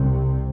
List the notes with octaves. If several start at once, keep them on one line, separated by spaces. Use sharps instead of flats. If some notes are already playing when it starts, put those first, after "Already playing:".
Already playing: C2 C3